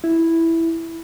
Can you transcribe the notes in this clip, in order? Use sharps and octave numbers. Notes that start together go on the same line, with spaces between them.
E4